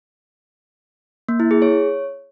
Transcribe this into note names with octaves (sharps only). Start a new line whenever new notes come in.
A#3
E4
G#4
C#5